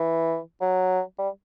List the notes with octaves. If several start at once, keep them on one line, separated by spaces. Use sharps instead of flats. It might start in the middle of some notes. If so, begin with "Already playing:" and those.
Already playing: E3
F#3
G3